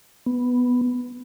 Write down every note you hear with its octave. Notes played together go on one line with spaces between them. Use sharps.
B3